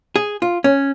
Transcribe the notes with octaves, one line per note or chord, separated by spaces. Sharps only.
G#4
F4
C#4